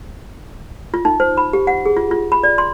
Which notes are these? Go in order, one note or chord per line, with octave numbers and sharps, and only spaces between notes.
F4
D#4
C5
B5
G4
F#5
G#4
F4
F4
B5
D5
C6